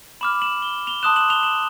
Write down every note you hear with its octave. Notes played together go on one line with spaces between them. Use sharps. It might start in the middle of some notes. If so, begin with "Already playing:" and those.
B5 D6 F6 E7 F#7
E7 F#7
G7
F7 G7
A5 C6 D#6 F#6 E7 F#7
E7 F#7
F7 G7
E7 F#7